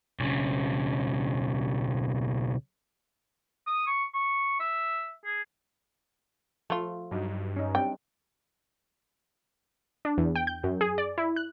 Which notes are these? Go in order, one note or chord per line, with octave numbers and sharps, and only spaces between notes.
B1 C#3
D#6
C#6
C#6
E5
G#4
F3 A3 F4
G2 F#3 D#4 F#4
C#4 D#4
G3 C4 D4 G5
D4
E2
G5
G6
F#2
G#4
D5
E4
F#6